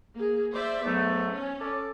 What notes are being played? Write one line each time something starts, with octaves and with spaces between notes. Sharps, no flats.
A#3 G#4
C5 D5 E5
G#2 F#3 A3 B3
C#4
A4 D5